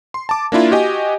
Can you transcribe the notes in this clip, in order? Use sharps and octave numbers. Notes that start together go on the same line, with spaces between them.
C6
A5 D6
A#3 D4 E4 F4
F#4 G4 D#5 G#5